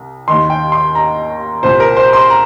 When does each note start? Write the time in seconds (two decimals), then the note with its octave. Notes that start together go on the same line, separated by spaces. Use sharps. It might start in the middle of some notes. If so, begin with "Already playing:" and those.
Already playing: C2
0.28 D#2 D#3 C6
0.50 G5
0.72 C6
0.95 A#5
1.62 C2 A#2 C5
1.80 A#4
1.97 C5
2.13 C6
2.30 A#5